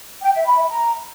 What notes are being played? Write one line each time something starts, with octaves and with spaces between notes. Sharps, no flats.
G5
E5
B5
E5
A#5